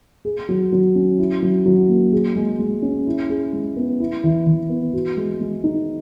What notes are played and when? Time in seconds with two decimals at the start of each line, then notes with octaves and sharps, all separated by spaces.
0.25 G#4
0.49 F#3
0.72 F#3
0.95 C#4
1.18 E4
1.42 F#3
1.66 F#3
1.89 A#3
2.12 G#4
2.36 G#3
2.59 G#3
2.82 C#4
3.07 E4
3.30 G#4
3.53 G#3
3.76 B3
4.00 E4
4.24 E3
4.46 E3
4.69 B3
4.94 F#4
5.17 G#3
5.41 G#3
5.64 D#4